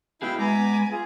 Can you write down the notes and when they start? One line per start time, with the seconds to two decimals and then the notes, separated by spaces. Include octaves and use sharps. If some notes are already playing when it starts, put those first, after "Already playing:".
0.22 B3 E4 F#4 G#4 F5 G5 B5
0.39 G#3 B3 G#5 A#5 B5 D6
0.91 F4 G#4